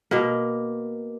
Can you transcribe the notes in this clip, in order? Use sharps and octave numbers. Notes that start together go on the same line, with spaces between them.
B2 A#3